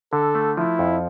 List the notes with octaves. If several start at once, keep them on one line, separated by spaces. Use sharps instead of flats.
D3 A4
A3
F3 E4
F2